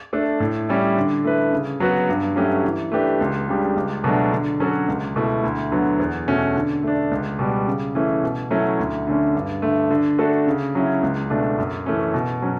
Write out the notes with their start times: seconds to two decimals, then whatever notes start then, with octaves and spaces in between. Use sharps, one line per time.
0.13 A3 D4 A4
0.40 A2
0.69 G3 C#4 E4
0.97 D3
1.24 A3 E4 B4
1.52 C#3
1.80 F#3 B3 F#4 B4
2.09 G2
2.36 F#3 A3 C#4 G4
2.64 E3
2.92 A3 D4 G4 B4
3.20 C#2
3.49 C#3 G3 D4 G4
3.76 C#2
4.04 B2 F#3 A3 D4
4.32 D3
4.60 F#3 C#4 F#4 A4
4.88 C#2
5.16 B2 A3 E4
5.44 D2
5.71 D3 F#3 B3
5.99 E2
6.28 B2 A3 C#4 F#4
6.56 D3
6.83 A3 D4
7.11 C#2
7.39 B2 G3
7.67 C#3
7.95 E3 A3 C#4
8.23 B2
8.51 F#3 A3 C#4 E4
8.79 D2
9.07 D3 A3 C#4
9.35 G2
9.62 D3 A3
9.90 D3
10.19 A3 D4 F#4 A4
10.47 C#3
10.75 F#3 C#4 E4
11.03 C#2
11.30 B2 A3 D4
11.58 F#2
11.86 E3 A3 C#4
12.14 B2
12.42 F#3 C#4